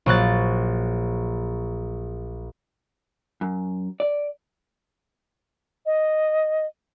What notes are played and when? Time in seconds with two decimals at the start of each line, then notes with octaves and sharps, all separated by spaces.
0.06 A#1 F#3 F#6 A6
3.41 F#2
4.00 D5
5.86 D#5